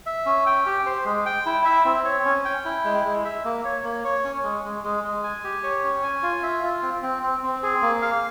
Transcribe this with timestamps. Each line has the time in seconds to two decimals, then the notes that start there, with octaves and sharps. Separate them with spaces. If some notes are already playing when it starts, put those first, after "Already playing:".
0.06 E5
0.26 C#4
0.46 G5
0.66 G4
0.86 C5
1.05 G#3
1.26 G5
1.46 E4
1.65 E5
1.85 C4
2.05 C#5
2.25 C#4
2.45 G5
2.65 E4
2.85 G#3
3.05 G#3
3.25 E5
3.45 A#3
3.65 C#5
3.84 A#3
4.05 C#5
4.25 C#4
4.44 G#3
4.64 G#3
4.84 G#3
5.04 G#3
5.24 G#5
5.44 G4
5.63 C#5
5.83 C#4
6.03 G#5
6.23 F4
6.43 E5
6.63 F4
6.83 C4
7.02 C4
7.23 C4
7.43 C4
7.63 G#4
7.82 A#3
8.02 F5